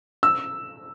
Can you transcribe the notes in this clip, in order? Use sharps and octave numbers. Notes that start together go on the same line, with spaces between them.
E6